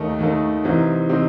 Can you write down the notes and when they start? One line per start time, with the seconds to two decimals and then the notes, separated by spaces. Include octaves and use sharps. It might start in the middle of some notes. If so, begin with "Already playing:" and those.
Already playing: D#2 D#3 A3 D#4
0.19 D#2 D#3 A3 D#4
0.64 C2 C3 E3 C4 D#4
1.09 C3 E3 C4 D#4